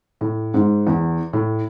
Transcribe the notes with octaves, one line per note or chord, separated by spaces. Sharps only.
A2
G#2
E2
A2